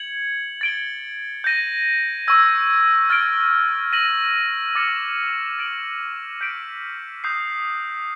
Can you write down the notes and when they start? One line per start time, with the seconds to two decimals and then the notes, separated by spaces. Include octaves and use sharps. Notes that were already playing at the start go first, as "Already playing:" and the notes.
Already playing: G#6 C#7 F#7
0.61 A6 D7 G7
1.44 G6 A#6 D#7
2.28 C#6 E6 G#6
3.10 F6 A6 D7
3.92 F6 A#6 D#7 F#7
4.75 D6 F6 A6 C#7 E7
5.59 A6 D7 F#7
6.41 G6 B6 D7
7.24 D#6 G6 C7